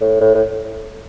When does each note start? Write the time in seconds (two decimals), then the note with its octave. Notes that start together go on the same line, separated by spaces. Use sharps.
0.01 A2
0.21 A2
0.35 A2